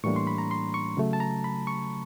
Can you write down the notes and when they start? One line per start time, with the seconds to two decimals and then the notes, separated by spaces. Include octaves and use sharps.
0.04 A2 E3 G3 A#3 D4 C#6
0.16 C6
0.27 B5
0.38 A#5
0.51 C6
0.74 C#6
0.97 C#3 F#3 A3
1.13 A5
1.20 A#5
1.44 B5
1.67 C#6